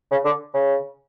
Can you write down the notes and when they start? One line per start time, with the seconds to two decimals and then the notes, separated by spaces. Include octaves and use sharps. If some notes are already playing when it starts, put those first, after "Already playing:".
0.11 C#3
0.25 D3
0.54 C#3